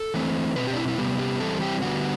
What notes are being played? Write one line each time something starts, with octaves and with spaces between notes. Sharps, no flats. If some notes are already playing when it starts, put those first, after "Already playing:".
Already playing: A4
E3 A3 C4
B2 A3 C4 B4
G4
D4
E4
E4
C3 G3 B3 G4
G4
E3 G3 C4 A4
G4
D3 G3 B3 F#4